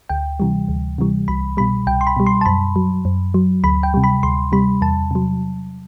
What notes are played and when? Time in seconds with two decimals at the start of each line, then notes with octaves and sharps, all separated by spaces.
0.09 D2 G5
0.40 C3 E3 G3
0.68 D2
0.98 C3 E3 G3
1.28 C2 B5
1.57 B2 G3 B5
1.87 C2 G5
2.01 C6
2.07 B5
2.17 B2 G3
2.27 C6
2.41 A5
2.46 F#2 B5
2.76 F#3
3.05 F#2
3.34 F#3
3.64 D2 B5
3.83 G5
3.94 C3 G3
4.04 B5
4.23 D2 C6
4.52 C3 G3 B5
4.82 E2 A5
5.11 C3 F#3